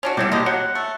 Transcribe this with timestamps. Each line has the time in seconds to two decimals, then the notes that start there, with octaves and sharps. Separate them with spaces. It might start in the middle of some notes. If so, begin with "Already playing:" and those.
0.03 C#4 D4 F#4
0.17 B2 F#3 G3 E4 F#4 G4
0.32 D3 A#3 G4 D#5
0.46 F#3 F#5
0.75 A3